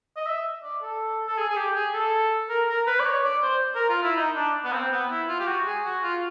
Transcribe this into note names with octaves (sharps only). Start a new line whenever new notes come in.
D#5
E5
D5
A4
A4
G#4
G#4
G4
G#4
A4
A#4
A#4
B4
D5
C#5
D5
C5
A#4
F4
E4
D#4
D4
B3
C4
B3
E4
F4
G4
F#4
G#4
F#4
F4